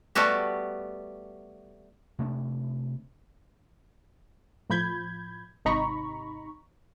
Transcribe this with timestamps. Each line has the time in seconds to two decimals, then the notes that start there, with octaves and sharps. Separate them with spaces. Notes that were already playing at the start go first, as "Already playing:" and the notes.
0.15 G3 A3 B3 F#4 G4
2.19 C3 A3 B3 D4
4.69 A2 F3 B5 G6 G#6
5.65 G#1 C3 D#4 A#5 B5 C#6